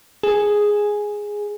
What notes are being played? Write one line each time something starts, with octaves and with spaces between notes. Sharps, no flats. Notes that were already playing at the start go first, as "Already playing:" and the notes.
G#4